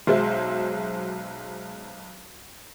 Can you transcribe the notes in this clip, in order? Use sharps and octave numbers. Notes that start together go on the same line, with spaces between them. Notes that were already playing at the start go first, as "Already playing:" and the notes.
B1 F#3 G#3 C5 E5